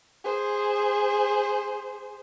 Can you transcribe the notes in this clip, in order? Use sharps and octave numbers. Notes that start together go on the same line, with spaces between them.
G#4 C5